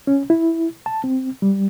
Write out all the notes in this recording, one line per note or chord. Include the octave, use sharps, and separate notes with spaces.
C#4
E4
A5
C4
G3